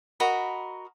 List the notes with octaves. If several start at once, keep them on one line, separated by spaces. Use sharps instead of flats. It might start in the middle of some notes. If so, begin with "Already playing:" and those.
F#4 A#4 D#5 B5